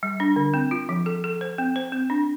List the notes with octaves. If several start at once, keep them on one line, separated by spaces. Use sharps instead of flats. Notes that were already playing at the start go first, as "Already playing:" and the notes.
G3
D4
D3
C4
F4
F3
A4
A4
C5
C4
C5
C4
D4